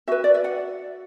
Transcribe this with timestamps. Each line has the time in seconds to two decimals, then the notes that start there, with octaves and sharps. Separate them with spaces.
0.08 F#4 B4 E5
0.24 D5
0.34 E5
0.44 F#5